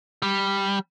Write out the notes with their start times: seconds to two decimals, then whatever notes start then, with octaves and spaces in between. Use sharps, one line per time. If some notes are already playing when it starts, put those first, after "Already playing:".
0.23 G3